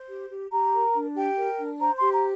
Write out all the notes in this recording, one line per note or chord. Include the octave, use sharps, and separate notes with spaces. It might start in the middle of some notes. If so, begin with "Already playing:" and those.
Already playing: C5
G4
G4
G4 A#5
A#4
D4
G4 G5
A#4
D4
C5 A#5
G4 C6
A#5